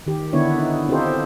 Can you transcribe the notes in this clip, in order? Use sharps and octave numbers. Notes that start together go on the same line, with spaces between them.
D#3 G4
D3 B3 D4 E4 C#5
D#4
C4 D#4 F4 G4 A4 C5